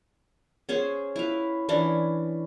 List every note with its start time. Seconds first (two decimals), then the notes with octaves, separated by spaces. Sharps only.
0.69 C#4 G#4 C5 C#5
1.16 E4 B4 F5
1.69 E3 C#4 D4